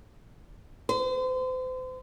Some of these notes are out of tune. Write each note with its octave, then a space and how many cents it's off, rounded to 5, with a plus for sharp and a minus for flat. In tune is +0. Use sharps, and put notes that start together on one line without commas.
C5 -35